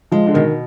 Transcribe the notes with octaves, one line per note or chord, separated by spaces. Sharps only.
F3 G#3
D3
B2 D#3